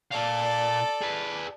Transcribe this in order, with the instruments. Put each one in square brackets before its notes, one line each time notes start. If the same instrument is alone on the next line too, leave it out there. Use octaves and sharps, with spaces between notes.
[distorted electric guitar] A#2 F5 [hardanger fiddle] A4 D5
[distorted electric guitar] G#4 B4